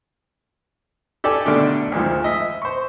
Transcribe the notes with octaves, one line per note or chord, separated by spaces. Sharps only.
G4 A4 D5 G5 G#5
B2 D3 D#3 A3 D4 G4
D2 G#2 D#3 F3
D#5 E5
C5 C#6